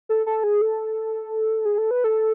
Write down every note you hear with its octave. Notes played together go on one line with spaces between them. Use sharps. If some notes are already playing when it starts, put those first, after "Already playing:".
A4
A4
G#4
A4
G#4
A4
B4
A4